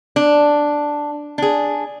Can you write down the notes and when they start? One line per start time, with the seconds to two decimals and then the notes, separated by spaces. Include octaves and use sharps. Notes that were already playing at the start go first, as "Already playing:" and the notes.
0.16 D4
1.38 D4 G#4